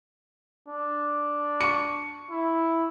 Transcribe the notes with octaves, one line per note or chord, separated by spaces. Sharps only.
D4
C#6 C#7
E4